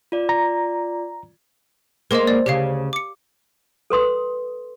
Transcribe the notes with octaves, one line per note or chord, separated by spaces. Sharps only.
F4 D5
A#5
G#3 A#3 A#4 C5 D#5
D5
D2 C#3 C#4 G4 F5
D6 C#7
A4 B4 C6 D#6